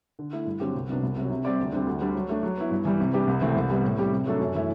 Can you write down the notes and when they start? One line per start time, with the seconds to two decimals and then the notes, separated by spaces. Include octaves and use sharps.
0.19 D3
0.33 A3 E4
0.46 G2
0.60 D3 F#3 C4 G4
0.75 C2
0.89 C3 F#3 B3 D4
1.03 C2
1.17 C3
1.22 F#3
1.30 C3
1.45 G3 C4 G4 D5
1.59 D2
1.72 D3 G3 C4 G4
1.87 D2
2.01 D3 G3 D4
2.15 F#3
2.29 A3 D4
2.43 F#3
2.57 B3 E4
2.71 G2
2.85 E3 G3
3.00 C3
3.13 G3 D4 G4 B4
3.28 C2
3.41 C3 E3 A3 C4
3.56 C2
3.70 C3 G3 B3
3.84 A2
3.98 G3 C4 G4
4.12 C3
4.26 F#3 A3 D4 A4
4.40 F#2
4.55 E3 A3 E4